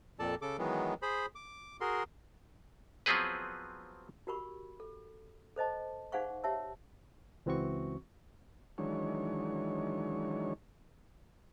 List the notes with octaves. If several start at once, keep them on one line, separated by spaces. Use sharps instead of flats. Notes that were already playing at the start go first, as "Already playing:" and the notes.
F2 A#2 A4 D5 A5
C#3 A4 D6
D#3 E3 F#3 G#3 B3
G#4 C5 B5
D6
F#4 G#4 A#4 C6
F3 F#3 B3 C4 G#4 B4
F#4 G4 A#4 B5 C#6
A4
A4 C5 D#5 A5
D#4 G#4 C5 F5 F#5 C#6
G4 C#5 E5 A5 E6
C#2 E3 C4 F#4 C#6
D#3 E3 F#3 G#3 D4 C#5